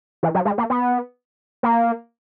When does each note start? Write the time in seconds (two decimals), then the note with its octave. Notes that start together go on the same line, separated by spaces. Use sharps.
0.23 E3
0.35 F#3
0.45 G#3
0.58 A#3
0.70 B3
1.63 A#3